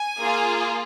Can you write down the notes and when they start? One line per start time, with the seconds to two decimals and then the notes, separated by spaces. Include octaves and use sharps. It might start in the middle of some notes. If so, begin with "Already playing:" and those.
Already playing: G#5
0.18 A#3 F4 G#4